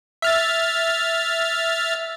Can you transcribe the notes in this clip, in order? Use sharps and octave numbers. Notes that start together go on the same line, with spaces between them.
E5 F6 A6